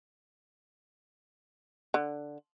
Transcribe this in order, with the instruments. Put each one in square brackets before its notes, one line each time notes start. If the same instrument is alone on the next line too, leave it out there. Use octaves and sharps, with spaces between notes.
[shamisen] D3